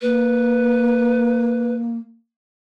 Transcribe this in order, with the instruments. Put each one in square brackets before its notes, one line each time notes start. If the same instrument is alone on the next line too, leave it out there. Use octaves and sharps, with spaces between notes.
[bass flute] A#3 [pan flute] B4